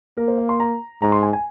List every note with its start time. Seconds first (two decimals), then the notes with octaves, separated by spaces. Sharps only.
0.17 A#3 A#4
0.28 C5
0.38 F5
0.49 C6
0.60 A#5
1.02 G#2 A#5
1.12 C6
1.23 G#5
1.33 G#5